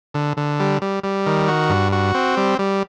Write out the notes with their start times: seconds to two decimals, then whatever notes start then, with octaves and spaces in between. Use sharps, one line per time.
0.14 D3
0.37 D3
0.60 G3
0.82 G3
1.04 G3
1.26 D#3
1.48 F#4
1.69 G2
1.92 F#4
2.15 C4
2.37 G3
2.59 G3